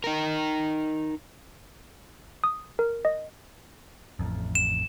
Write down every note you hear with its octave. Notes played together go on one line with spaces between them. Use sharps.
D#4 A#4
D#6
A#4
D#5
A1 F2
E7